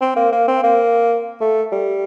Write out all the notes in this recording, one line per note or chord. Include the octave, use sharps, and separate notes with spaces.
C4
A#3
A#3
C4
A#3
A3
G3